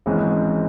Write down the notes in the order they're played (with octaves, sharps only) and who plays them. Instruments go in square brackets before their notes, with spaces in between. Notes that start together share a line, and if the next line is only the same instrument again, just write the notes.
[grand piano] G#1 G#2 E3 G#3 C#4